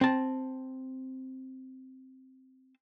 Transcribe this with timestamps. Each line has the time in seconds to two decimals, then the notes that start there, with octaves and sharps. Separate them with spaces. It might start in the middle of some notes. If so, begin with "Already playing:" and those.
0.01 C4 A5